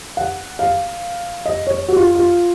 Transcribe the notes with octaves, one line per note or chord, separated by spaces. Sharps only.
F#5
F5
D#5
C#5
F#4
F4
F4